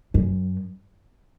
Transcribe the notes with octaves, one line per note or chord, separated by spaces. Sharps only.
F#2